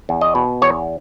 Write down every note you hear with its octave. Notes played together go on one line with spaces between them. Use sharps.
E2
D#5
B2
E2 C#5